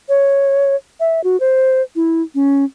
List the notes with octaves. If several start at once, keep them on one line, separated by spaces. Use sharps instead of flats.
C#5
E5
F#4
C5
E4
C#4